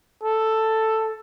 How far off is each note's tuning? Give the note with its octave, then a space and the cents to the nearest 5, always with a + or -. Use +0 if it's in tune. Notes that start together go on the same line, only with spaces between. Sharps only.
A4 +5